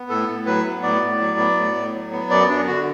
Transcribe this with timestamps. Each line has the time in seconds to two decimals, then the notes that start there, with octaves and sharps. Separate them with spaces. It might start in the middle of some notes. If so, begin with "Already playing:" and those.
Already playing: B3
0.09 A2 A4
0.28 A2
0.46 F#3 B4
0.65 B3
0.83 A2 D5
1.01 A2
1.20 F#3
1.38 B3
1.57 A2
1.75 A2
1.94 F#3
2.12 B3
2.30 F#2 D5
2.49 F#2 D4
2.67 D3 F#4